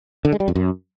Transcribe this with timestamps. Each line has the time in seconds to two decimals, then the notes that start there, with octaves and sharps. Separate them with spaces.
0.25 D3
0.32 G#3
0.40 G3
0.48 F2
0.55 F#2